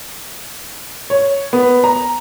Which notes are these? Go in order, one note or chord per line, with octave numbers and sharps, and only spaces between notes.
C#5
B3
A#5